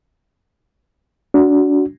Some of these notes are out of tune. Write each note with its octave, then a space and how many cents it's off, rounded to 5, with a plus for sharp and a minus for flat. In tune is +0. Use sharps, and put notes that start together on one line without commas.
D4 -30 F#4 +0